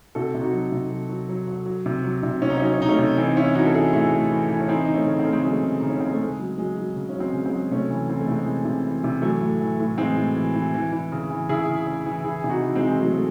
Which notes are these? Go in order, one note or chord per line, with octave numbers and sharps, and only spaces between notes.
C3 F#4 A4
C3
D#4 F#4
F#3
C3
F#3
F#3
F#3
F#3
F#3
C3
F#3
C3
C3 C#4
D#4
C#4
F#3 D#4
C#4
C3 D#4
A3 C#4
C3
E3 C4 D#4
E3 C#4 E4
E3 D#4 F#4
A4
E3 E4 G#4
A2 E4 G#4
A2
E3
E3
C#4
E3 C4 D#4
C#3 D#4
A3 C#4
C#3
C4
C#3 A3
G#3 C4
C#3 F#3 A3
C#3
C#3 D#4
C#4
C#3 C4
A3
C#3 G#3
F#3
F#3 G#3
F#3
C#3
C#4
F#3
G#3 C4
C#3
G#3 C4
F#3
C3 A3 C#4
E3
E3 C4
A3
C3 G#3 C4
E3
C3
E3
C3
E3 F#3 A3
A2
E3
A2
E3 G#3 C4
A2
E3
E3
E3
E3
C#3
E3
C#3 E4 G#4
C#3
C#3
E3
E3 E4 G#4
C3
D#4 F#4
E3
G#3 C4
E3
C4
E3 F#3 A3
A3